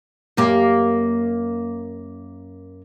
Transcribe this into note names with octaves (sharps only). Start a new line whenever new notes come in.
F#2 A#3 G4